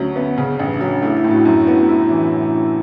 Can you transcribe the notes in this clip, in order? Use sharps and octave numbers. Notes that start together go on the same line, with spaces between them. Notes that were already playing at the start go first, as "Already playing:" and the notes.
Already playing: D2 F#3 C#4
B3
C#3
A1 C#4
D4
F#3
D4
A3 E4
E4
A2
F#4
F#2
B3
E4
E3